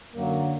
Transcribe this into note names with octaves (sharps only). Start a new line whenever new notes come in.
F#2 D3 F#3 A#3